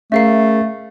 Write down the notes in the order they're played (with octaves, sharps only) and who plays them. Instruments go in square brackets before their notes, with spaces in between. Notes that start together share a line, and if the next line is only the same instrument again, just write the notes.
[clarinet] A3 [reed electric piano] C#4 G#4 A#4 [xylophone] E5 F5 C7